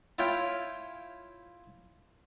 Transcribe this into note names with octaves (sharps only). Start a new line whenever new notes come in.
E4 F4 C#5 G5